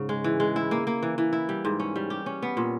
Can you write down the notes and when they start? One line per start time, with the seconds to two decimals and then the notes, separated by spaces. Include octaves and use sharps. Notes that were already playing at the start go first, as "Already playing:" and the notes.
Already playing: G#2 C#3
0.09 G#3
0.24 E3
0.40 G#3
0.56 E4
0.71 A#3
0.87 A#3
1.03 E3
1.18 E3
1.33 E4
1.49 G3
1.65 G#2
1.80 C#4
1.96 G3
2.10 G4
2.26 C#4
2.42 B3
2.57 A#2